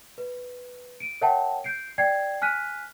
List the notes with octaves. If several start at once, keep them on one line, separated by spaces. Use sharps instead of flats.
B4
D7 D#7
A#4 C#5 E5 F#5 G5 A5
G6 C7 D7
D5 G5 G#6 C7
G#5 F6 F#6 B6 D#7